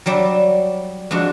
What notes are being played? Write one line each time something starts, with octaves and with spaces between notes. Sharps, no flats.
F#3 G3 D5 E5
F2 G#3 D4 F#4